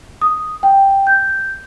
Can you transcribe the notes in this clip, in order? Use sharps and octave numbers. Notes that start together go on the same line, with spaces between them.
D#6
G5
G6